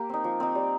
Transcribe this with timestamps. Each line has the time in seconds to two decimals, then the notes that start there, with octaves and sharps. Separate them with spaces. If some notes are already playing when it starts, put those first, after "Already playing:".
Already playing: A#3 G4
0.09 C4 D#4
0.24 F3
0.40 C4 D#4
0.55 G3